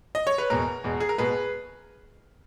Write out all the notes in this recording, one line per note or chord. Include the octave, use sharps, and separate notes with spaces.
D#5
C#5
B4
E2 B2 G#3 A#4
E2 B2 G#3
G#4
A#4
B2 G#3 G#4 B4